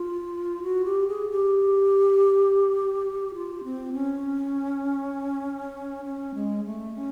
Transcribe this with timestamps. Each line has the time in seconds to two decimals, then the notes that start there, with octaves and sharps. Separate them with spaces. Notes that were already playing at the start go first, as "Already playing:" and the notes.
Already playing: F4
0.63 F#4
0.85 G4
1.08 G#4
1.31 G4
3.34 F4
3.64 C4
3.94 C#4
6.05 C#4
6.35 G#3
6.65 A3
6.95 C#4